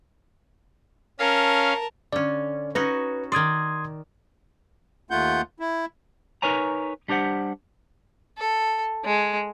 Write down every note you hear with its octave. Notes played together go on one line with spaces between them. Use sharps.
C#4 A#4 F5 A5
D3 C#4 D5
C#4 D#4 F#4 B4
D#3 D5 C6 D#6 G#6
D#2 A3 F4 F#5 G6
E4
D#4 A#4 B4 C#5 G#5 A#5
G3 D4 G4 C5 F#5
A4
G#3